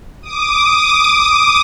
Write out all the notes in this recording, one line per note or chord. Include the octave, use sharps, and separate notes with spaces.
D6 D#6